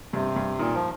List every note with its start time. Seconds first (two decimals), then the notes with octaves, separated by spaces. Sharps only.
0.13 G2 C3
0.36 G2
0.59 A#2 D#3
0.74 F3